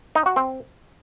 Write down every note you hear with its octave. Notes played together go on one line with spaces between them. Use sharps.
D#4
F#4
C4